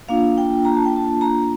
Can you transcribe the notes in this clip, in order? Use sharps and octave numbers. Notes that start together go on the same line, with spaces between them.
A#3 D4 F4 F5
G5
A#5
A5
G5
A5
A#5